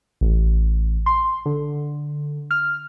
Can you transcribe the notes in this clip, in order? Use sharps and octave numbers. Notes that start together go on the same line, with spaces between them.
A1
C6
D3
F6